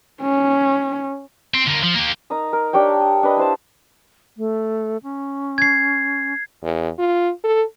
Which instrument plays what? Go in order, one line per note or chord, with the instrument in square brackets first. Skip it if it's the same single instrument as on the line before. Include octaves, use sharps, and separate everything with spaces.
[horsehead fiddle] C#4
[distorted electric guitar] C4
D3 A#3
F3
A#3 G4
[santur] D#4 A#4 A#5 D#6
A#4
D4 G4 C#5 G5
D#6
D4 B4 D#5
E4 C5 A5
[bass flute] A3
C#4
[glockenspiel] G#6 C7
[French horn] E2
F4
A4